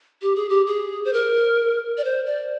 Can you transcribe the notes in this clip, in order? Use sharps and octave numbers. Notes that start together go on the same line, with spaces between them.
G4
G#4
G4
G#4
C5
A#4
D5
C5
D5